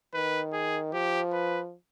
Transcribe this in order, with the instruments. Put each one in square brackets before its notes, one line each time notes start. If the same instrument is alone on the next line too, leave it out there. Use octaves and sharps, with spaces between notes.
[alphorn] D#3 [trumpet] B4
[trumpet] G#4
[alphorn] F3 [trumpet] G4
[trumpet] B4